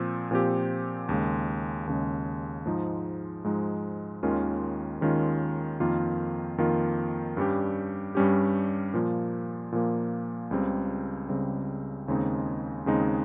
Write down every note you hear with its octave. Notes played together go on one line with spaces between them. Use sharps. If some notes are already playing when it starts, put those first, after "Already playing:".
Already playing: A#2 F3 C4
A#2 F3 C4 G4
D#2 C#3 G#3
D#2 C#3 G#3
G#2 F3 G#3 D#4
G#2 F3 G#3 D#4
D#2 D#3 G#3 C#4 F4
D#2 D#3 G#3 C#4 F4
F2 D#3 A#3 F4
F2 D#3 A#3 F4
G2 G3 C#4 G4
G2 G3 C#4 G4
A#2 F3 A#3
A#2 F3 A#3
C#2 C#3 G3 C4
C#2 C#3 G3 C4
D#2 C#3 G#3 C4 D#4
D#2 C#3 G#3 C4 D#4